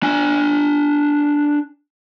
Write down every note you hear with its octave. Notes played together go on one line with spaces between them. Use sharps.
D4 G#5